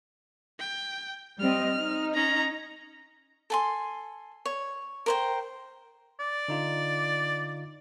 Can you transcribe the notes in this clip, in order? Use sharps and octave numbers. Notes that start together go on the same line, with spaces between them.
G5
G3 C4 D#5 F6
D#4
C#4 A#5
A4 G#5 C6
C#5
A#4 C5 G5
D5
D3 D#4 F4